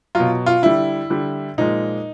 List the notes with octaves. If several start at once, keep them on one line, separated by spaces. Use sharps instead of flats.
F#3 F4
B2
F4
D3 G3 E4
D3 G3
A#2 F3 G#3 D#4